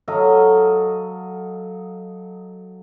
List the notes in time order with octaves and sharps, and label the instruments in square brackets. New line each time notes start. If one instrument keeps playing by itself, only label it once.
[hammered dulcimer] F#3 A4 D#5 F5